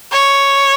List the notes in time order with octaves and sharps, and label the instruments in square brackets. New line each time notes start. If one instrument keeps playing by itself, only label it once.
[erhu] C#5